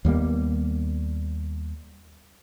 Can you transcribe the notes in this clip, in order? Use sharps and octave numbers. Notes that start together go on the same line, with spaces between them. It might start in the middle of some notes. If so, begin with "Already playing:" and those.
D#2 G3 A#3 B3